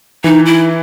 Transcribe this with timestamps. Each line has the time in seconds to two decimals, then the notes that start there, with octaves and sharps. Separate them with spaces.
0.24 E3 D#4
0.46 E4